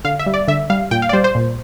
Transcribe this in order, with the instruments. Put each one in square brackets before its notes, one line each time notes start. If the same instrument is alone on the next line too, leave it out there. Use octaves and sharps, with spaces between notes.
[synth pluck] D3 F5
E5
G3
D5
D3 E5
G3 F5
A#2 G5
F5
D5
G3 C5
C5
A#2